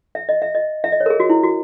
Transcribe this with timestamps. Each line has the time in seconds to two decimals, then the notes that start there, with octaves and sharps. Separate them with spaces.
0.15 E5
0.29 D#5
0.42 E5
0.55 D#5
0.84 E5
0.92 D#5
1.00 C#5
1.06 A#4
1.10 G#4
1.20 F#4
1.30 E4
1.43 F#4